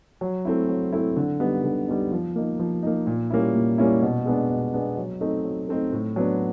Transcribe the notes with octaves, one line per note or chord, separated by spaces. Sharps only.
F#3
A3 C4 E4
F#3
A3 C4 E4
D3
G3 B3 D#4
D3
G3 B3 D#4
F3
A#3 D#4
F3
A#3 D#4
A#2
G3 A#3 C#4 E4
A#2
G3 A#3 C#4 E4
B2
G#3 B3 D4
B2
G#3 B3 D4
F#3
A3 C4 D#4
F#3
A3 C4 D#4
A2
F#3 B3 D4